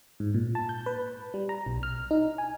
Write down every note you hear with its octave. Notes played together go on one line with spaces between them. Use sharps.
G#2
A#2
A5
G6
B4
G3
A#5
B1
F6
D#4
G#5